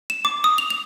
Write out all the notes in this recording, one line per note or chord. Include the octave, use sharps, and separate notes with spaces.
E7
D6
D#6
F7
F7